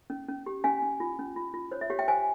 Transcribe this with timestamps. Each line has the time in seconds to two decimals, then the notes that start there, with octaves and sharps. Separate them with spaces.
0.10 C#4
0.28 C#4
0.46 G4
0.64 C#4 F5 G#5
0.82 C#4
1.00 F4
1.19 C#4
1.36 F4
1.54 F4
1.71 C5 C#5
1.81 E5
1.90 G4 C#5 F5
1.99 E5 G5
2.08 C5 F5 G#5